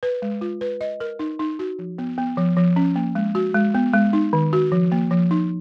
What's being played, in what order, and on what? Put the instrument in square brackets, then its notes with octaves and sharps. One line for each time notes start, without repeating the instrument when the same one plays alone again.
[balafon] B4
G#3
F4
B4
D#5
A#4
D#4
D#4
F#4
F3
B3
B3
F3
F3
C#4
A#3
G#3
F#4
G#3
B3
G#3
D#4
D#3
F#4
F3
A#3
F3
D#4